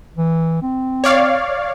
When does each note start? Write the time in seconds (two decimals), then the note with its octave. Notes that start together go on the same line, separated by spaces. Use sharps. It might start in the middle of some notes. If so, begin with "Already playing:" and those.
0.17 E3
0.62 C4
1.04 C#5 D5 F5